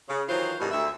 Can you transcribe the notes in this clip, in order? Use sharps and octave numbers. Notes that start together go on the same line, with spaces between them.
C#3
D#3 E3 F#3 F4 C5
G2 B2 D#3 E3 G3 G#3
D2 E5